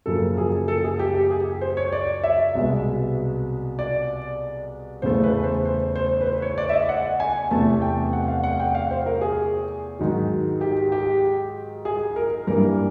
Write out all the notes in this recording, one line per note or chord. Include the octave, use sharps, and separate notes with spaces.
F#2 C#3 F3 A#3 A4
G#4
A4
G#4
G4
G4
G#4
C5
C#5
D5
E5
C2 B2 G#3 B3
D5
E2 C#3 E3 A3 C5
B4
C5
C5
C5
B4
C5
C#5
D5
E5
D#5
F#5
G#5
E2 C3 E3 A3 A5
G5
F#5
F5
F#5
G5
F5
C5
A#4
G#4
G#2 D#3 F#3
G4
G4
G#4
A#4
G2 E3 G3 A#3 A#4